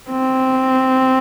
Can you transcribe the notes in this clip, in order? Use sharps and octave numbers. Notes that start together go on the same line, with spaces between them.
C4